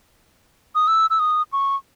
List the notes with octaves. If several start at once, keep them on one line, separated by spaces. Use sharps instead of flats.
D#6
E6
E6
D#6
C#6